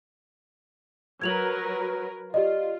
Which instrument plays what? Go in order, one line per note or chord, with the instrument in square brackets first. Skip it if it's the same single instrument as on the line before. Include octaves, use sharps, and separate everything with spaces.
[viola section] F#3 A#4 B4 [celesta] G#6 F7 F#7
[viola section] F4 [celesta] G4 D5 D#5